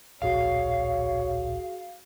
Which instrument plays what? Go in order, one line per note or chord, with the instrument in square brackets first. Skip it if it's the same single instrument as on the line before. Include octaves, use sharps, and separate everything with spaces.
[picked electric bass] D1 A#1 [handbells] F#4 G#4 C7 [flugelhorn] C#5 [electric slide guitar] F5